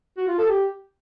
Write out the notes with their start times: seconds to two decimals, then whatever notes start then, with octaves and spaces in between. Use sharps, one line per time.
0.17 F#4
0.28 F4
0.38 A4
0.49 G4